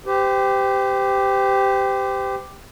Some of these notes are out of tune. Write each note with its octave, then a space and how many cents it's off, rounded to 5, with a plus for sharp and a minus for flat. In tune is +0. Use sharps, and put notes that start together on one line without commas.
G4 +0 C5 -40